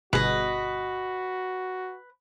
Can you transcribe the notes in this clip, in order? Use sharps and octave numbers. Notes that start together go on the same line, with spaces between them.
G1 B2 F#4 G#4 B4 D#5